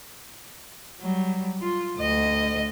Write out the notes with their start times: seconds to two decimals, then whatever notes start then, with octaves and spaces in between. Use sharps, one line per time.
1.01 F#3 G3
1.62 F4
1.99 D2 D#5